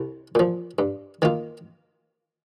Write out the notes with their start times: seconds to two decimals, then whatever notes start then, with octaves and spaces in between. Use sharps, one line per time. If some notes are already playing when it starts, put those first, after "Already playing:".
Already playing: C2
0.35 A#2 F3
0.79 G2
1.22 D#3 A#3 F4